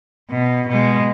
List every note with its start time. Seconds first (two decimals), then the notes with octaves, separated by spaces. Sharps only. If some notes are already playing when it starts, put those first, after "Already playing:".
0.31 B2
0.68 B2 G#3